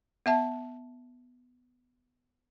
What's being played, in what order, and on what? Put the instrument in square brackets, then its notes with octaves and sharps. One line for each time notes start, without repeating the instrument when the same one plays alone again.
[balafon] B3 E5 A5